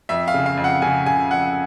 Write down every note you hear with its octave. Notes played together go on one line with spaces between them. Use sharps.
F2 E5
F5
C#3
F5
F2
F#5
C#3 G#5
C#3 G#5
F2 F#5